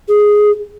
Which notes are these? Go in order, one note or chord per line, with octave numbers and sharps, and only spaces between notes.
G#4